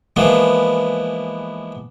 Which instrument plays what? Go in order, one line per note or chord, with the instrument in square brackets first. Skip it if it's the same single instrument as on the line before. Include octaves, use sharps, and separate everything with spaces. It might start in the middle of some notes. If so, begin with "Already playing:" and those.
[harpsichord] E3 F3 G#3 A#3 B3